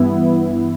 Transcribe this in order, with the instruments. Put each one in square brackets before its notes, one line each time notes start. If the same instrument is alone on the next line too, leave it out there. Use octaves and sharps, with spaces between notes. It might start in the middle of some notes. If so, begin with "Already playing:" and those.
Already playing: [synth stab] G2 E3 B3 E4